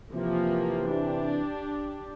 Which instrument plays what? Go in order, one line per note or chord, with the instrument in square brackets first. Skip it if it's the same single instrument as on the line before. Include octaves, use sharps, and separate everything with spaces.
[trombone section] C3 E3 [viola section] F3 A#3
[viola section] D4 G4